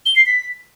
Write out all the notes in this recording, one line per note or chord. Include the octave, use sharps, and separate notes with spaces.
G7
C7
B6